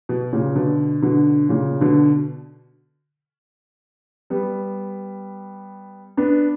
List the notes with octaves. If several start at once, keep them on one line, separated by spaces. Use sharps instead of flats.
B2
A#2 C#3
B2 D3
B2 D3
A#2 C#3
B2 D3
G3 B3
B3 D4